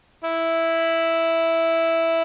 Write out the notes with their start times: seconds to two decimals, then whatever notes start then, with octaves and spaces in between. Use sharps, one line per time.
0.24 E4